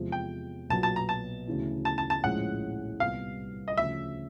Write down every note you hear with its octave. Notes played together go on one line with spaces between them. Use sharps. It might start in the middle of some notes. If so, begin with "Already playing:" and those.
Already playing: E2 C3 F3 G#3
G5
B1 A#2 F#3 B3 A5
A5
A#5
A5
D2 C#3 E3
A5
A5
A5
A#1 A2 F3 G#3 C#4 F#5
C2 A#2 G3 B3 F5
D#5
D2 C#3 F3 E5